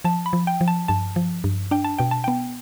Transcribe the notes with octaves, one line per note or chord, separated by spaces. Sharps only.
F3 A5
B5
F3
G5
F3
A5
G2 A5
F3
G2
D4 G5
A5
B2 G5
A5
B3 G5